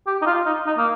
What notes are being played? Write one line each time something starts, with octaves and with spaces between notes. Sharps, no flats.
G4
D#4
F4
D#4
D#4
A#3